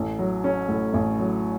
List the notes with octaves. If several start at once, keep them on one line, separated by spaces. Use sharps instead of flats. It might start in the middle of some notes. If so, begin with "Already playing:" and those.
Already playing: A1
F#3
C#4
A2
A1
F#3